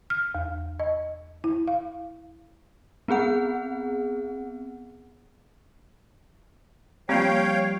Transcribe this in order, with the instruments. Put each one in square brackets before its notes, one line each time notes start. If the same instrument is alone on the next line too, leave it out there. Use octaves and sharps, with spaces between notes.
[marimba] F6
E2
D#5
E4
F5
[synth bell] B3 C4 G#4 F#5
[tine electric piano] F3 G3 [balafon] A#3 C4 [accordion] C#5 F5 G5